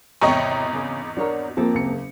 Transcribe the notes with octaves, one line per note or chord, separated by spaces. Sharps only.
G#1 E2 C3 C#5 D#5 G5 A#5 C#6
C#3
D4 F#4 A#4 C#5
F3 A#3 C4 A4
F#1 C#7